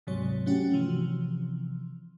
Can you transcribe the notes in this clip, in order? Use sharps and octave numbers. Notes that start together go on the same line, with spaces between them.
D2 G#2 C3 F#3 C#5
F#3 A3 C#4 F#4 G4
C3 E3 F3